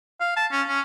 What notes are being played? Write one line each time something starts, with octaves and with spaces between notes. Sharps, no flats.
F5
A5
C#4
C#4